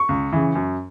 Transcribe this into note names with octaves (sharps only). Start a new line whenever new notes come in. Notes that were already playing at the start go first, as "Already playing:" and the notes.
Already playing: C#6
C#2
C#3 E3
F#2